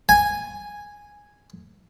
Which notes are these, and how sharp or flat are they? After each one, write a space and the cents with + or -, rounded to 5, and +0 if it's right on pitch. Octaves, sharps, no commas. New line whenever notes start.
G#5 -5